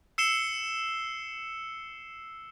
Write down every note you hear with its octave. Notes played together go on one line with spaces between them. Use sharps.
E6 C7 C#7 E7 G7